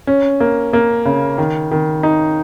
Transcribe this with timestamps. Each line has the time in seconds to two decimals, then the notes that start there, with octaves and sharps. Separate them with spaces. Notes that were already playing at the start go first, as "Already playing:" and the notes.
0.07 C#4
0.40 A#3
0.73 A#3
1.05 C#3
1.38 D#3
1.71 D#3
2.03 D#4